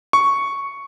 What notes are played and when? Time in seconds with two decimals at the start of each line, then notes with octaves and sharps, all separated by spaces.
0.13 C#6